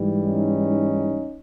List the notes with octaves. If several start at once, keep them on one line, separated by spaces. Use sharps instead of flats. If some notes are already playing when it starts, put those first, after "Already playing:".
Already playing: G#2 E3 G3
C#4 D#4